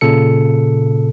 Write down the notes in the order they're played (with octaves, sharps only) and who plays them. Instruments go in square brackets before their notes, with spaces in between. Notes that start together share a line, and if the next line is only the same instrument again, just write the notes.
[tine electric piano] A#2 C#3 A4 C#7